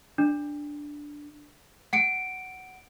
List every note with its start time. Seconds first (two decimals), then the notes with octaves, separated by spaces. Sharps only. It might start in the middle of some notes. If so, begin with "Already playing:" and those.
0.18 D4
1.93 F#5 C#7 D7